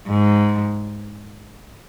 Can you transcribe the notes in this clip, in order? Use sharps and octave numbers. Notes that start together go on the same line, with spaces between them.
G#2